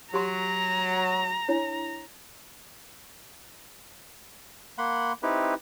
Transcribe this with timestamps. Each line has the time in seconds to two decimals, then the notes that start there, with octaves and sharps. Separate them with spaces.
0.14 F#3 G4 A#5 C6
1.48 D4 E4 C#5
4.78 A#3 F#5 B5 C6
5.23 C4 D#4 E4 G4 B4